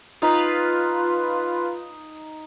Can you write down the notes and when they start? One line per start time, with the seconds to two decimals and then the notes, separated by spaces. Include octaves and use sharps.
0.22 D#4 F4 B4